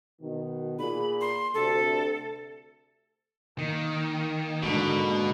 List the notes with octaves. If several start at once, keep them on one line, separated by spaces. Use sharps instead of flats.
B2 D#3
A#2 G#4 B5
C6
D2 C3 A4
D#3 A#3
G#2 B2 D3 G#3 A#3